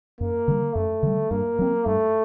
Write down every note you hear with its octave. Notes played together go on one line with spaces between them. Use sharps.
F#2 A#3
D3 G3
F#2 A3
D3 G3
G2 A#3
F#3 C4
G2 A3